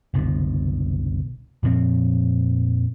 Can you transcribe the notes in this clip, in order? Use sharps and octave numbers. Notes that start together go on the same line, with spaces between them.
F#1 C2 B2 D3
F2 A#2 F3 C4